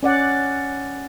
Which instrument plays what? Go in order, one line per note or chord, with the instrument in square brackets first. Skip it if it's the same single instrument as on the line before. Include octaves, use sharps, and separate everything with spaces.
[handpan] C#4 D5 F#5